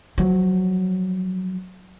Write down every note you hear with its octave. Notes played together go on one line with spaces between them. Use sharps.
F3 F#3